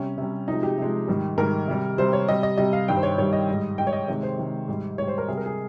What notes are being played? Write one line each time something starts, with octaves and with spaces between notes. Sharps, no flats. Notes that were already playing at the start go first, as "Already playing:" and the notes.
Already playing: C3 G3 C#4
C3 G3
C3 F3 G#3 D#4
G4
C3 F3 G#3
G#2 D#3 G3
G#2 D#3 G3 A#4
C3 G3
C3 G3 C5
C#5
C3 G3 D#5
D#5
C3 G3 D#5
F5
G2 D#3 G3 G5
C5
C#5
G2 D#3 G3 C#5
D#5
G#2 G3
G#2 G3 G5
C#5
D#5
C3 D#3 G#3 C#5
C5
C3 D#3 G#3
G#2 G3
G#2 G3 C#5
C5
A#4
C3 G3 G#4
A#4
G#4